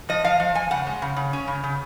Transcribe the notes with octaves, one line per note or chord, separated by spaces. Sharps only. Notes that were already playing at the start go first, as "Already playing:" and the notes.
F3 D#5
F3 F5
F3
F3 G#5
C#3 F#5
G#3
C#3
C#3
C#4
C#3
C#3